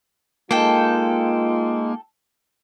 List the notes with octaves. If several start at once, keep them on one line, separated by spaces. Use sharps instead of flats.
G#3 A#3 D#4 F4 A4 G5